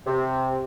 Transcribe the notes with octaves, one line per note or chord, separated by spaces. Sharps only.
C3